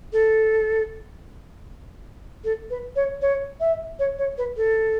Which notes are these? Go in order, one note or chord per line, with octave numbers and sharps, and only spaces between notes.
A4
A4
B4
C#5
C#5
E5
C#5
C#5
B4
A4